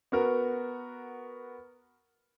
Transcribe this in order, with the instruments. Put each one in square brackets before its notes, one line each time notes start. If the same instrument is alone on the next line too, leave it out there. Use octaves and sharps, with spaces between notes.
[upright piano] B3 F#4 A#4